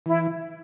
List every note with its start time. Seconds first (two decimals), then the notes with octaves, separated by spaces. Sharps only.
0.06 E3 E4